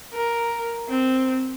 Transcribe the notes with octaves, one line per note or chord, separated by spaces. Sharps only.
A#4
C4